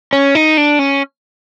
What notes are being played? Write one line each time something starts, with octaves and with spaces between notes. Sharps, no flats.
C#4
D#4
D4
C#4